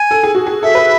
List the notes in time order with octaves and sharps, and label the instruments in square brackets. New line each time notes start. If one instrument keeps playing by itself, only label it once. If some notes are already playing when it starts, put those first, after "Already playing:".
Already playing: [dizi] G#5
[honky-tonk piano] A4
G#4
F#4
G#4
[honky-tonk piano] A4 [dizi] E5
[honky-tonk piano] B4